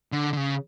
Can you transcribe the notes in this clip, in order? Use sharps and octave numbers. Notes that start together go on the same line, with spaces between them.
D3
D3
C#3